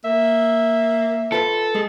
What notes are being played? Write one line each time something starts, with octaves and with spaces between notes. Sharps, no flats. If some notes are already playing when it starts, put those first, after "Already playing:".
A#3 E5
F4 A4 B4 A5
G#3 G#4